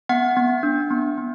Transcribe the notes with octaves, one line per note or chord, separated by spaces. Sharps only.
B3 F#5
B3
D4
B3
B3